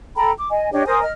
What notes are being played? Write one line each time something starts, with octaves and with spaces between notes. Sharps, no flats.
A4 G5 A#5 B5
D6
D#5 G#5
D4 G4 C#5 D#5
A#4 C5 G#5 D#6
D#5 F6